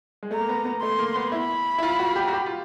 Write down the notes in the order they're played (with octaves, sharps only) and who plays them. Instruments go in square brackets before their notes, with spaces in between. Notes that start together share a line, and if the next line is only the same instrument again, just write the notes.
[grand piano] G#3
[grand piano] A3 [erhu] A#5
[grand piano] A#3
B3
B3
[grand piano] A3 [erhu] C6
[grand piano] A#3
B3
[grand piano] E4 [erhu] B5
[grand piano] E4
F4
F#4
G4
F#4
G4
F4